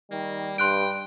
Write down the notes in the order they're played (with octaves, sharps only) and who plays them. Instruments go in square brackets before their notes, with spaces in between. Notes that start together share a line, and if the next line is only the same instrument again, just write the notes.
[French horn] D#3 [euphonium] G3 [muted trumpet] A#3
[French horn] G2 [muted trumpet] G5 [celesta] C6 F#6 D7